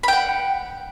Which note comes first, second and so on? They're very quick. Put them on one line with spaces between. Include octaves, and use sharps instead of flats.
B5 G5 F#5